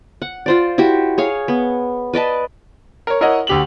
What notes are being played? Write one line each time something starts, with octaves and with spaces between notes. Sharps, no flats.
F#5
F4 C5 D5
E4 F#4 G4
G#4 C#5 F5
B3
B4 D5 D#5 A5
A#4 C#5
E4 A#4 C#5 D#5 F#5
D2 D3 G4 F7 F#7